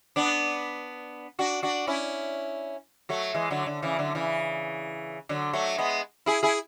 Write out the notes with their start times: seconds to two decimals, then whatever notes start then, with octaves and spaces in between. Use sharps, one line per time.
0.16 B3 D4
1.39 D4 F#4
1.62 D4 F#4
1.87 C#4 E4
3.09 F#3 A3
3.34 E3 G#3
3.51 D3 F#3
3.66 D3
3.82 C#3 E3
3.99 D3 F#3
4.15 C#3 E3
5.29 D3 F#3
5.53 F#3 A3
5.78 G#3 B3
6.26 E4 G#4
6.43 E4 G#4